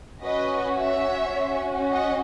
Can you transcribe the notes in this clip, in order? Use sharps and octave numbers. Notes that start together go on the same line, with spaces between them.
C#4 F#4 B4 D#5
C#5 E5
C#4 F#4
D#5 F#5